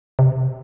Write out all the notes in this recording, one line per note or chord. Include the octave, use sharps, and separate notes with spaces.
C3